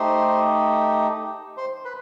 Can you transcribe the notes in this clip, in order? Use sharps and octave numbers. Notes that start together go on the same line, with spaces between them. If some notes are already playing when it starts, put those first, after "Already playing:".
Already playing: A3 D#4 G4 C5
C5
B4